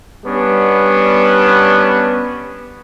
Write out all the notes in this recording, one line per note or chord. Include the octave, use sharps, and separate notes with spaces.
G3 B3 C#4 D4